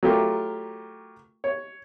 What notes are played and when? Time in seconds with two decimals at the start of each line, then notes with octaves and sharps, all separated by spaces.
0.03 F#3 A3 F4 G4 A#4
1.44 C#5